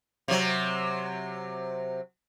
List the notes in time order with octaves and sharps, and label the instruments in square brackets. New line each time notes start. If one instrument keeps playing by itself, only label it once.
[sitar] C3 F#3